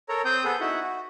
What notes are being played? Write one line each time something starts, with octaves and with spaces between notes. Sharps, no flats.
A4 A#4 C#5 A#5
C4 C5 G5 D#6 G6
B3 G#4 A4 B4
D#4 E4 F#4 E5 F#5
F#4